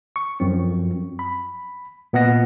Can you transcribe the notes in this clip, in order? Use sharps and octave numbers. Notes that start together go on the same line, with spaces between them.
C#6
F#2 F3 C4
B5
A#2 B3 D#5 F#5 A#6